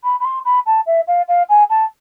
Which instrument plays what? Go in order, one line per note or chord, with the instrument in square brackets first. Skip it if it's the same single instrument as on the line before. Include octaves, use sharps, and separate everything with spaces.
[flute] B5
B5
C6
B5
A5
E5
F5
F5
G#5
A5